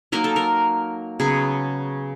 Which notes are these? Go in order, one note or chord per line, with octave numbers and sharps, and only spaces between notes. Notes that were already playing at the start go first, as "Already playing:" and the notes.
F#3 A#3 D#4 A#4
A4
A#4
C#3 F#3 B3 G#4